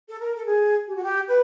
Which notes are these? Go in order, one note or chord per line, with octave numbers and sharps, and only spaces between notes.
A4
A#4
A4
G#4
G4
F#4
G4
B4